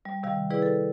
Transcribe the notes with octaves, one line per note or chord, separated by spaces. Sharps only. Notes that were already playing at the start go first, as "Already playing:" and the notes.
G3
C3 D#3 G3 F5
E4 G#4 B4 D5
A4